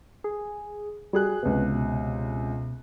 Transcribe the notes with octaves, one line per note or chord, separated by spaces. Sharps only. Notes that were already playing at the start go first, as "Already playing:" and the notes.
G#4
G3 F#4 G#4 F#6
C#2 C3 B3
B2